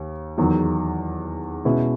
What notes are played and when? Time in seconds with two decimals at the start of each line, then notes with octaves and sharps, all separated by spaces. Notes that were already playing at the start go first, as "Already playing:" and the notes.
Already playing: D#2
0.38 E2 D#3 F#3
1.65 B2 G#3 C#4 E4 B4